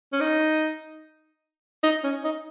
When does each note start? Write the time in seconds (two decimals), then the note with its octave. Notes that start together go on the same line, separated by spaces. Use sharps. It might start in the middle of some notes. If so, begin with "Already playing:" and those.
0.13 C#4
0.20 D#4
1.84 D#4
2.04 C#4
2.24 D#4